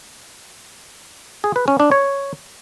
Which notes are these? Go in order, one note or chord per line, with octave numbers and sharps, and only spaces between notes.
G#4
B4
C#4
D4
C#5